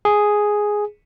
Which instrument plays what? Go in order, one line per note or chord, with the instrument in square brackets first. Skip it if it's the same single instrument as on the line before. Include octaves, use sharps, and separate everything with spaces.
[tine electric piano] G#4